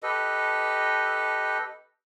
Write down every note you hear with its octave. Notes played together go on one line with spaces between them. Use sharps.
G4 A4 B4 D#5